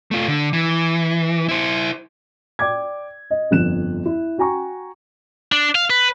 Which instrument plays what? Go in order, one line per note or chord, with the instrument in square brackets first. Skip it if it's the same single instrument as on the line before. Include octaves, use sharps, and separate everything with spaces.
[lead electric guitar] A3 F4
D3
E3
E4 C5
[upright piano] D5 G5 D6 G#6
D#5
G1 F2 F#6 E7
E4
F#4 G5 G#5 A#5 C#6
[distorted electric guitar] D4
F5
B4